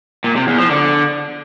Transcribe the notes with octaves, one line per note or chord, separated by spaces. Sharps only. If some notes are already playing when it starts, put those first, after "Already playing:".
A#2
C3
E2
F3
D3